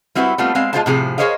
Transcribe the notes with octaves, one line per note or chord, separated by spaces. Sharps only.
G3 C4 E4 F#4 G4 B4
G3 A3 B3 C4 F4
G#3 C4 F5
G#3 F4 G#4 C5 F5 A5
A2 C3 F3 G#4
G#4 A#4 C5 C#5 D#5 F5